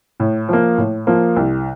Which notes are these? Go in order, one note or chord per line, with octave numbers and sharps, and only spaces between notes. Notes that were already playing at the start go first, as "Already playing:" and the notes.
A2
F3 A#3
A2
F3 A#3
C2